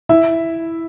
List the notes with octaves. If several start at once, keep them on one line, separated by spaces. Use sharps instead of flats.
E4 E5